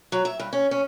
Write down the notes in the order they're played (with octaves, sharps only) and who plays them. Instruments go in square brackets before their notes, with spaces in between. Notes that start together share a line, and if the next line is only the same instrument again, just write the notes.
[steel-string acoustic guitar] F#3
E5
G2
C#4
C#4